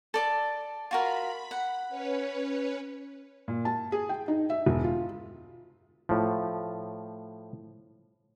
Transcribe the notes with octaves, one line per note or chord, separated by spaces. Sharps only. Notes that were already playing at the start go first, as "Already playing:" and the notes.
A4 D5 A5
F4 F#4 A#4 B5
F#5
C#4 B4 C#5
A#2
A5
G#4
G5
D#4
E5
E1
F4
A2 F3